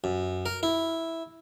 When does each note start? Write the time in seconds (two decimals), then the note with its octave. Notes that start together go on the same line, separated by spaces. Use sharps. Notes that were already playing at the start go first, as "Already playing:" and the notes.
0.04 F#2
0.46 A#4
0.63 E4